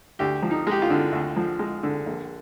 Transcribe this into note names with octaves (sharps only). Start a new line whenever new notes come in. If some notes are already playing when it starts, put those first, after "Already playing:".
D2 G4
F3
D#4
G#3 G4
F4
D3
D2
F3
G#3
D3
A#1